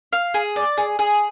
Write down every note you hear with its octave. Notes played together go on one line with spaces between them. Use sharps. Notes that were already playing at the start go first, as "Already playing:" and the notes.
F5
G#4
D5
G#4
G#4